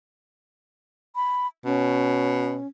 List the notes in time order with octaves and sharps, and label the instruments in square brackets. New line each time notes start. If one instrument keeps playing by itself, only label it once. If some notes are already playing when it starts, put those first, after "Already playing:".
[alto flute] B5
[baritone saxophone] B2 [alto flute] C#4